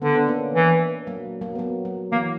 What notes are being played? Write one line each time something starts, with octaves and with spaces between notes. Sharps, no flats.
D3 B3 D4
B3 D4
A#3 C#4
E3
F#3 A#3
F#3 A#3
B3
F#3 A#3
F#3
E3 A#3